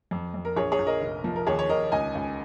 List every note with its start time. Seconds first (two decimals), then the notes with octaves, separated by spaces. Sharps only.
0.11 F2
0.34 F2
0.45 A#4
0.56 A#1 G#4 C#5
0.72 G#4 C#5
0.79 A#1
0.86 A#4 D#5
1.01 F1
1.24 F3
1.36 A#4
1.47 D#2 G#4 C#5
1.59 C#5
1.69 D#2 A#4 D#5
1.92 C#2 D#5 G#5
2.15 C#2